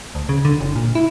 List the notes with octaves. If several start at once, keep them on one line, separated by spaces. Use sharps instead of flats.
D2
C#3
D3
F#1
A#2
E4